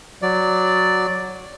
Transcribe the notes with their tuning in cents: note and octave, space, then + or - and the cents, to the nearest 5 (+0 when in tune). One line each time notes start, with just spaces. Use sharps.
F#3 +0 D5 +0